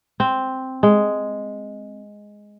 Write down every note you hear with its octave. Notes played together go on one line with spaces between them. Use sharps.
C4
G#3